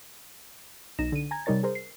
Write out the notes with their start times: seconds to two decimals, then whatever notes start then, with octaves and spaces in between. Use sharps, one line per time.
0.99 B1 D#4 A#6 E7
1.12 D3 D#7
1.31 G#5 A#5 G#6
1.46 C3 G3 D#4 A#4 C#5 A6
1.63 G#4 A#4 C5
1.75 C7